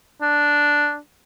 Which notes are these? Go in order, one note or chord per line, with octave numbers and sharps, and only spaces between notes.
D4